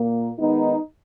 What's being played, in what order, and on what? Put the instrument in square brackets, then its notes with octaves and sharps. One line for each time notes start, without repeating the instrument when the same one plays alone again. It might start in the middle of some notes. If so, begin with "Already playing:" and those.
Already playing: [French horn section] A#2 A#3
D#3 G#3 B3 D#4